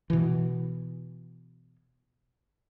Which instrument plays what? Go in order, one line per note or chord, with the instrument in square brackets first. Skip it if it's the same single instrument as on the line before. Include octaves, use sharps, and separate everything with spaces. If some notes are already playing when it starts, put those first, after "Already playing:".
[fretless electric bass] B2 E3